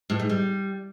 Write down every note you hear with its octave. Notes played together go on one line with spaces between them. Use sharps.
A2
G#2
G3